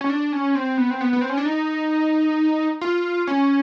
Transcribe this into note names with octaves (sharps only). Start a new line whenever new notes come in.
C#4
D4
C#4
C4
B3
C4
B3
B3
C4
C#4
D4
D#4
F4
C#4